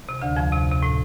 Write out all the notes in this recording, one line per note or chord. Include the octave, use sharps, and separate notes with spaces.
C3
D2 D3
F2 F3
C3
C3
A2